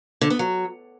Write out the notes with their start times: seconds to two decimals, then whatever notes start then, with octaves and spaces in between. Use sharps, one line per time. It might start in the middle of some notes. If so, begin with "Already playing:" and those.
0.21 D3
0.30 B3
0.39 F#3